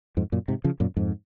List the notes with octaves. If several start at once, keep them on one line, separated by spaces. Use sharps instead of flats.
F2 G#2
F#2 A#2
G#2 C3
C#3 F3
F#2 A#2
F2 G#2